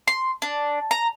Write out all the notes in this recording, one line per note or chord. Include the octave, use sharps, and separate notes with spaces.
C6
D4
A#5